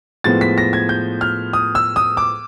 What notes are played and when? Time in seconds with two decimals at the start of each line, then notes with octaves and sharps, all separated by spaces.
0.24 A2 F3 G#3 B3 A6
0.41 B6
0.58 A#6
0.73 G#6
0.89 G6
1.21 F6
1.53 D#6
1.75 E6
1.96 D#6
2.17 D6